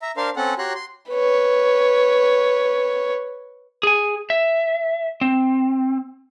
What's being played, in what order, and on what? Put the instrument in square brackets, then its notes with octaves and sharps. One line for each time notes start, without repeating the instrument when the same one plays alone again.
[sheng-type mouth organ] E5 A#5
D4 A#4 C5 F5 C6
C4 C#4 A4 F#5
F#4 G4 C#5 A#5 C6 F#6
C6
[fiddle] B4 C#5
[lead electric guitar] G#4 G#5
E5
C4